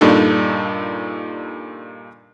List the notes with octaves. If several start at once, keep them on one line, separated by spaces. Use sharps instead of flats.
G2 A#2 D4 D#4 A4